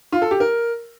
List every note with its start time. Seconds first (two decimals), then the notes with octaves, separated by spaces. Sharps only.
0.12 F4
0.22 A4
0.31 G4
0.40 A#4